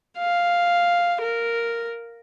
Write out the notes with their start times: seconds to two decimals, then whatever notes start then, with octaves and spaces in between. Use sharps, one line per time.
0.18 F5
1.21 A#4